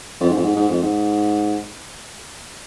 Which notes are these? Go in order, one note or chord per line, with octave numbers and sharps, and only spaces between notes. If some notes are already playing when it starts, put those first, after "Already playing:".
F2
G#2
F2
G#2
G#2
F2
G#2